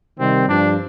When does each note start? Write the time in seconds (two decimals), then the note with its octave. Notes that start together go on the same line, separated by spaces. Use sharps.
0.20 C3 D#3 G3 C4
0.48 G2 F3 D4